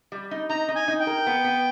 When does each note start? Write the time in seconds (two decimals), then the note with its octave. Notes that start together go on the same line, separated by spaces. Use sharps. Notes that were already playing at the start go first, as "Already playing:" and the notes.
0.12 G3
0.31 D#4
0.49 D#4 A#5
0.68 D#4
0.75 G#5
0.88 D#4
1.00 G5
1.07 A#4
1.27 B3
1.44 B3